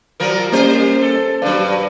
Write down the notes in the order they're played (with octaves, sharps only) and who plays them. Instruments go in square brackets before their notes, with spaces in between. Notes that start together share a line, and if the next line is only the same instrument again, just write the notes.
[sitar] F3 F#3 A#4
[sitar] G3 C5 [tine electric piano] A#3 C#4 A#4
[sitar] A4
[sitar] G2 F#3 [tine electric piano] B4 D5 F5